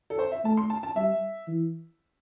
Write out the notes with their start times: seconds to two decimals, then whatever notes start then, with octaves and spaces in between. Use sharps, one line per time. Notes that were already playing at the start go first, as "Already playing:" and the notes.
0.10 A4
0.19 C5
0.32 E5
0.44 A3 A5
0.57 C6
0.70 A5
0.83 A5
0.96 G3 E5
1.47 E3